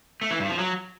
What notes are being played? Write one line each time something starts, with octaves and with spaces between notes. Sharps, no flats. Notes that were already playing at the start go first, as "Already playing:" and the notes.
A3
E3
G2
F3
F#3